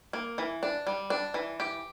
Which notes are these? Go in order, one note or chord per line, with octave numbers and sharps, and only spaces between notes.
A#3
E3
D4
G3
D4
E3
G4